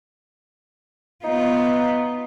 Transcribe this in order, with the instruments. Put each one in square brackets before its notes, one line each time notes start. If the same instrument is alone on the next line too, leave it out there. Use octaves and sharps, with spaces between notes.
[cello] B3 F4 [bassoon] D#4